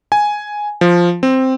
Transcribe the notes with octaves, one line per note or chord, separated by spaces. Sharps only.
G#5
F3
C4